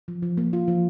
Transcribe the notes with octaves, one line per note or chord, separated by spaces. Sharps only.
F3
F3
A#3
F4
F3